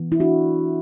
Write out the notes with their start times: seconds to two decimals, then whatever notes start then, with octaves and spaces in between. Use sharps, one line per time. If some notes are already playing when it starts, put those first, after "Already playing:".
Already playing: E3 B3
0.12 E4
0.20 D4 F#4